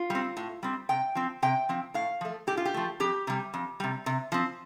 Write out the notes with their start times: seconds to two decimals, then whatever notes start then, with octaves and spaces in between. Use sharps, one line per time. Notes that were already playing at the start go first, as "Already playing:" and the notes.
Already playing: F4
0.10 G3 C4
0.37 A2
0.63 G3 C4
0.89 C3 G5
1.15 F3 C4
1.42 C3 G5
1.69 F3 C4
1.94 A2 F5
2.21 F3 A3
2.47 A2 G4
2.57 F4
2.65 G4
2.74 F3 A3
3.00 F2 G4
3.27 C3 G3
3.54 F2
3.80 C3 G3
4.06 C3
4.32 F3 C4